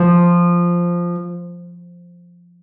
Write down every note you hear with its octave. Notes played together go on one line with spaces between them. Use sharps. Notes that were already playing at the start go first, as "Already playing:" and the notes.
Already playing: F3